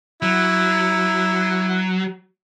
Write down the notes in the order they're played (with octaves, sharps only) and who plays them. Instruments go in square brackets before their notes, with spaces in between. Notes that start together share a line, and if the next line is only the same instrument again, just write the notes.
[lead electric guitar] F#3 [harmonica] E4